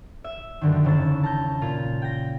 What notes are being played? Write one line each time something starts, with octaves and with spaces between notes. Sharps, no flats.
E5
F#2 D3 D#3
E1 C#3 E6 A6
A5 A#5 G6
A#2 F4
G5 A#6